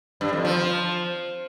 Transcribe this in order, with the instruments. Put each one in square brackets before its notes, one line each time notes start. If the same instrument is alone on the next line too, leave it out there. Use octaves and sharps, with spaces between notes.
[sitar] G2
F2
F3
F3